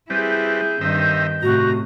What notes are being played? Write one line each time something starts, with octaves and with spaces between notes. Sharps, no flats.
G3 C4 E4 G#4 B4 G6
G2 D#3 C4 D#5 E5
A2 C3 F#4 A#5